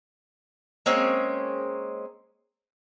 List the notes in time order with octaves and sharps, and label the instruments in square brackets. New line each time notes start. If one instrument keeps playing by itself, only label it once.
[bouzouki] G#3 A#3 C4 C#4